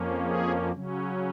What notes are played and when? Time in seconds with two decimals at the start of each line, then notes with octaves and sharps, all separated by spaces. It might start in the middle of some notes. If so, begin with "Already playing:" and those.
Already playing: F2 F3 A#3 C#4
0.24 G#4
0.72 C#3 F#3 C#4